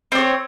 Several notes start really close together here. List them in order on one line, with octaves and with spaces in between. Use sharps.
C4 D5 C#5